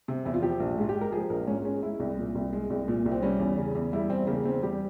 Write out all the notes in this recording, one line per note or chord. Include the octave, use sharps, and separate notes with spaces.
C3
E2 E4
F4
F3 G4
A#1
G#2 F4
G4
G#3
A#4
F3 G#4
A#1 A#4
G#2 C#4
G#3 C#4
G#3 E4
C2
A#2
C2
G#3
C2
A#2
C2
C4
G3 C#4
E2
C#3
E2
G3 E4
E2 C4
C#3 A#3
E2 C4
G3 G4